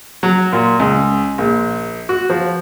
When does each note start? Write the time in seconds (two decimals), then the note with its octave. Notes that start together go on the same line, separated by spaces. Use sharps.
0.23 F#3
0.53 A#2
0.80 C#2
1.38 A#1
2.09 F#4
2.30 F3